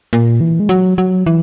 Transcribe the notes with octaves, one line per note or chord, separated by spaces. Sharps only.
A#2
E3
G#3
F#3
F#3
E3